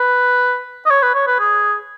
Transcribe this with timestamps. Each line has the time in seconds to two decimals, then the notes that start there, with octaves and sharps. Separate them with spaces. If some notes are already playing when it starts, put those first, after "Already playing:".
Already playing: B4
0.86 D#5
0.91 C#5
1.03 B4
1.15 C#5
1.27 B4
1.40 G#4